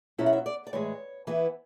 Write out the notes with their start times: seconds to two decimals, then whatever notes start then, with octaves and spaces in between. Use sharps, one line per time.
0.18 B2 F#3 C#4 E4 E5
0.26 F#5
0.33 E5
0.46 D5
0.67 D5
0.73 A2 E3 G#3 C#5
1.27 E3 B3 E4